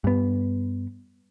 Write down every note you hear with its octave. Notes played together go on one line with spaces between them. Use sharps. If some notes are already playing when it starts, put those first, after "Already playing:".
G2 B3